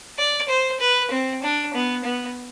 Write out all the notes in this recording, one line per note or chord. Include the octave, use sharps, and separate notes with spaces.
D5
C5
B4
C4
D4
B3
B3